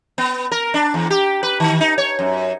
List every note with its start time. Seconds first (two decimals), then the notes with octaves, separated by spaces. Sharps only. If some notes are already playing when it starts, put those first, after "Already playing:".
0.18 B3
0.51 A#4
0.74 D4
0.94 E2
1.10 G4
1.43 B4
1.60 D#3
1.81 D#4
1.98 C#5
2.19 F#2